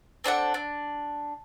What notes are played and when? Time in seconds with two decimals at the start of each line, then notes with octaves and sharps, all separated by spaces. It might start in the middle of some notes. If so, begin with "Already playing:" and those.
0.24 C4 D4 A4 F#5
0.54 D4